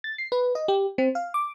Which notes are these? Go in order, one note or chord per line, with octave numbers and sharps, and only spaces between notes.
A6
C7
B4
D#5
G4
C4
F5
D6